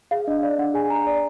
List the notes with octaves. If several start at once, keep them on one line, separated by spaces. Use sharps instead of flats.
G#4 F5
D4 D#5
D5 F5
D4 F#5
G#4 G#5
D4 A#5
D5